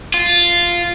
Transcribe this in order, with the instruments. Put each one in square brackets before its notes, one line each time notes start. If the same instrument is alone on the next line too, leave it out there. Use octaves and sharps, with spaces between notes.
[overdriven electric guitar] F4